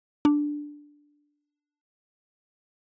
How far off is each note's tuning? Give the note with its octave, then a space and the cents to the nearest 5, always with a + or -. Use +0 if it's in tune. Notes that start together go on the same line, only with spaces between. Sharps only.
D4 +0